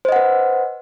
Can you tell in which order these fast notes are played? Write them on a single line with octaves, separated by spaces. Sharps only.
C5 D#5 F#5 B4